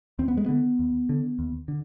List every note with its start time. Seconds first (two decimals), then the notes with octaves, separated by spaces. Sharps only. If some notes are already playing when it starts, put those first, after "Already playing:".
0.19 D#2 C4
0.28 B3
0.37 G#3
0.46 D3 B3
0.79 D#2
1.09 D3
1.39 D#2
1.68 D3